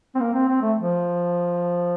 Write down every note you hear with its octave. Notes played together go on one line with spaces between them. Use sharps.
C4
A#3
C4
C4
A3
F3